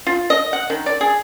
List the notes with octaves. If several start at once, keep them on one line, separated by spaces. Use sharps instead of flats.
F4
D#5
F#5
D#3
D5
G#4